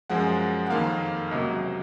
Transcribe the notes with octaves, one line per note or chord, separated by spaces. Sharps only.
F#2 F3 G#3 F#5
F#5
F2 D#3 A#3 F5
C#2 C3 F#3 A#3 D#5